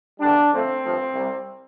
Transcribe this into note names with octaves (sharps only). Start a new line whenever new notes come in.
E2 D3 G3 D4
F2 D3 F3 A3 C4
G2 F3 A3
C2 C3 G3